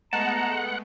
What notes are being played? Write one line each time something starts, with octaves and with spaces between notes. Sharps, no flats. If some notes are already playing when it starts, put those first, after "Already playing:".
G#3 A3 B3 D#5 F#5 A5 A#5